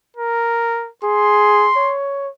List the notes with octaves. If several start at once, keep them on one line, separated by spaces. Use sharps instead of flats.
A#4
G#4 C6
C#5